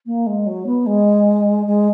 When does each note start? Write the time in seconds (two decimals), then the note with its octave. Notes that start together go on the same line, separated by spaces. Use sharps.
0.06 A#3
0.26 G#3
0.46 F#3
0.66 B3
0.86 G#3
1.66 G#3